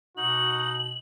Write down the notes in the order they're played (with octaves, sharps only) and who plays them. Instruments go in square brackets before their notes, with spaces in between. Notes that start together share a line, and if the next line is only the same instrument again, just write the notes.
[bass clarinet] B2 [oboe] D#4 [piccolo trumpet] F#4 [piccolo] F#7